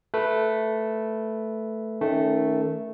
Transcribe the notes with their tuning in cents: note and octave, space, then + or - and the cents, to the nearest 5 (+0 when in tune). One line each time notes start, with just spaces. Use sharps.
A3 +0 B4 +0
D#3 +20 A3 +0 C#4 +0